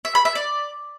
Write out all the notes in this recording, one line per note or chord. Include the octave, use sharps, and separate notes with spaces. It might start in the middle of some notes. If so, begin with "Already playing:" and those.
E5
B5
E5
D5